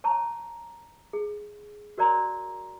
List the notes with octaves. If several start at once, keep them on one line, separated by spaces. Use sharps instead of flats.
C#5 A5 A#5 C#6
G#4
F#4 A#4 C#5 D5 A#5 C6